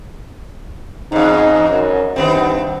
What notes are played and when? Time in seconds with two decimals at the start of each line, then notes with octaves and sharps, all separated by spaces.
1.12 E2 G#2 D#4
1.68 F#2
2.16 G2 D#3 B3 C4